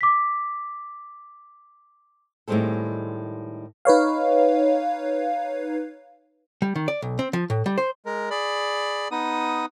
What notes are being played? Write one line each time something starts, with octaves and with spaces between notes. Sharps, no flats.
D6 B6
A2 D#3 G3 G#3 C4 A4
D#4 B4 C#5 F5
G3
D#3
D5
B1
C4
F3
A2
G3
C5
G#3 A#4
G#4 D5 B5
B3 D#4 D#6